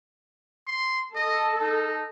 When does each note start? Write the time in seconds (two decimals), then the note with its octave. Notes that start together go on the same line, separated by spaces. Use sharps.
0.67 C6
1.15 A4 D#5
1.61 D#4